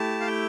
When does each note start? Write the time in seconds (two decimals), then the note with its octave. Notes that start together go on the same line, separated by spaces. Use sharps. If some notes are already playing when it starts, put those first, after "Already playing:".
Already playing: A3 E4 G4 A5
0.20 F5
0.27 G5